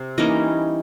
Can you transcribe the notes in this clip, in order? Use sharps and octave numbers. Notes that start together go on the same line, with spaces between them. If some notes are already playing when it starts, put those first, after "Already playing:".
Already playing: C3 C5
E3 G3 A#3 C#4 D#4 D#5